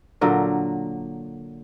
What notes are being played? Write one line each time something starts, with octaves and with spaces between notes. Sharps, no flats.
A#2 D3 F#3 A#4